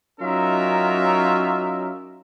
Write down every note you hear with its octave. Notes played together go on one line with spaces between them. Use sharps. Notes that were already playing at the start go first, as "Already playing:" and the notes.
F#3 C#4 D#4 F4 A#4 E5